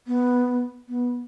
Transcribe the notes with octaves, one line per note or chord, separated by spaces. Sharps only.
B3
B3